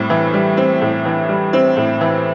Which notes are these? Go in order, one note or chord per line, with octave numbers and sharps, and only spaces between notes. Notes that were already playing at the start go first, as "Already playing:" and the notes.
Already playing: A2 G3 C4
E3
G3
C4
A2
E3
G3
C4
A2
E3